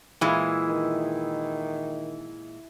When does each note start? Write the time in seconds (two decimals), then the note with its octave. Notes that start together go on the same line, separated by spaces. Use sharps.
0.21 A#2 E3 G#3 E4
0.69 D#3